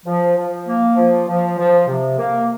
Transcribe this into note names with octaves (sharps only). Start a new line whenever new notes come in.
F3
F3
A#3
F3
F3
F3
C3
A#3